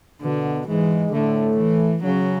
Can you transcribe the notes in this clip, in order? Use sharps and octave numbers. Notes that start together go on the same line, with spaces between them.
B2 D3 B3
G#2 E3 G#3
A2 D3 A3
E3
C#3 F#3 C#4